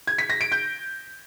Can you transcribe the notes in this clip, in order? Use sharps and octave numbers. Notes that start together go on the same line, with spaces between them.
G#6
B6
A#6
D7
G6